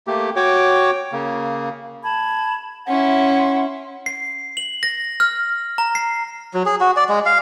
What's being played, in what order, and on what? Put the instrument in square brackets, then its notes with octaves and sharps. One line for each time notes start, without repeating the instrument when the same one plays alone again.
[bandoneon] A3 A#3 G4
F#4 C#5 G5 D6
C#3 A#3
[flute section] A5 B5 G#6
[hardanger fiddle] C#4 E4 [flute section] F#5 C6
[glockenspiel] C7
F#7
A#6
F6
A#5
C7
[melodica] F#3
G#4
F#4
D5
G#3
F5